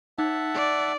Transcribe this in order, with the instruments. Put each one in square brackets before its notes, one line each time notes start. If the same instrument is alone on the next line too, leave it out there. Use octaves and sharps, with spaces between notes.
[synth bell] D#4 [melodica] E5 F#5 A5
[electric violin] D5